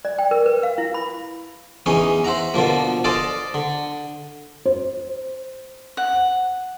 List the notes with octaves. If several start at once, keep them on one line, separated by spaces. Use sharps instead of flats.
D5
G5
A#4
B4
F5
E4
B5
E2 E3 C#4 D#4
C5 E5 F#5 A#5
B2 D3 F3 A#3
A4 C5 D5 D#5 F5 A5
D3
C5
F#5